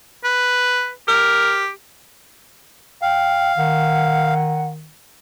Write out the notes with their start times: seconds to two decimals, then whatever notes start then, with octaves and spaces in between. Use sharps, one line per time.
0.24 B4
1.08 G4 A#4
3.02 F5 G5
3.57 D#3 F#5